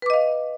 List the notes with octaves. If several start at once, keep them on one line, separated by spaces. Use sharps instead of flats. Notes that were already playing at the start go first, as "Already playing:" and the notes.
B4 D#5 F5 D6